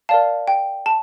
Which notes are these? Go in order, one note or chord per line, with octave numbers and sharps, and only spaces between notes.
A#4 D5 F5 A5
G5
A5